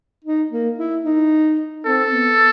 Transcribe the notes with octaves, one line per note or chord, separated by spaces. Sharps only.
D#4
A#3
E4
D#4
C4 A4
B3